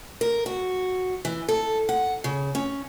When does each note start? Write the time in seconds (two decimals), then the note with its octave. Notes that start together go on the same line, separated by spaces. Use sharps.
0.21 A#4
0.46 F#4
1.25 E3
1.49 A4
1.89 F#5
2.24 C#3
2.55 C#4